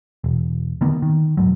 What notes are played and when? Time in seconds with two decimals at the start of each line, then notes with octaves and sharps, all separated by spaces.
0.24 E1
0.81 D3 D#3 A#3 B3
1.02 D#3
1.37 E1 D#2 G#2 F#3